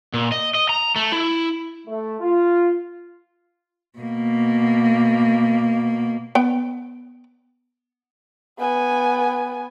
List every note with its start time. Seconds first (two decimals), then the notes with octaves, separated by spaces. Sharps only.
0.14 A#2
0.32 D#5
0.55 D#5
0.69 A#5
0.96 A3
1.12 E4
1.87 A3
2.20 F4
3.99 B2 A#3
6.35 B3 G5
8.59 B3 G#5